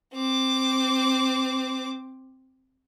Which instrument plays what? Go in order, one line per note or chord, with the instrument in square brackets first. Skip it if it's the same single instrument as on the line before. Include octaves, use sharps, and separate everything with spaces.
[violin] C4 D6